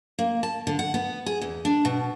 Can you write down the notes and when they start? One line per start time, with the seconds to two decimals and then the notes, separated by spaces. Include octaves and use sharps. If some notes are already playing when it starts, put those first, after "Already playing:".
0.19 A#3
0.43 A5
0.67 D3
0.79 F#5
0.94 B3
1.26 G#4
1.42 E2
1.65 D4
1.85 B2